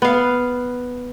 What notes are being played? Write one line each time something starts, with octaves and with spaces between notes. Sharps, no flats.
B3 F5